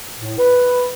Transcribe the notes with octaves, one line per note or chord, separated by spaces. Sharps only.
A2
B4